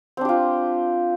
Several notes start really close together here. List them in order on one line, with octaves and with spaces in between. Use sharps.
C4 D4 G4 F4